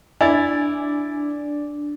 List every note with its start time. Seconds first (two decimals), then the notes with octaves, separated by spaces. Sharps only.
0.21 D4 E4 D5 G#5 A6